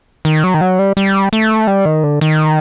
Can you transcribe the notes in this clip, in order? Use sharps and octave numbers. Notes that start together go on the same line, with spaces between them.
D#3
F#3
D#3
F#3
G3
G3
A3
G3
D#3
D3
D#3